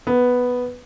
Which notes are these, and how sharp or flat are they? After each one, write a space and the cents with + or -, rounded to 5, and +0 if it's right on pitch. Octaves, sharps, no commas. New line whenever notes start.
B3 +0